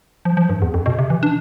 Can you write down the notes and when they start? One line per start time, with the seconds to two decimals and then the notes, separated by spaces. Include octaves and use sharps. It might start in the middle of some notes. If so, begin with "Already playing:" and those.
0.25 F3
0.37 F3
0.49 G2
0.62 E2
0.74 F2
0.86 B2
0.99 C3
1.10 E3
1.23 D4